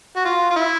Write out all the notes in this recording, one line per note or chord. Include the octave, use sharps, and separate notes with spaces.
F#4
F4
F4
E4